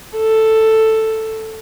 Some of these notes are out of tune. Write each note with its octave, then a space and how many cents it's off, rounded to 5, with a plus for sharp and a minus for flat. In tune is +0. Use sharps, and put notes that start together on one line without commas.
A4 +5